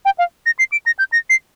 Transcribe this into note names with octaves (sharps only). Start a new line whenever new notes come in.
G5
F5
A#6
C7
D7
A#6
G6
A#6
C7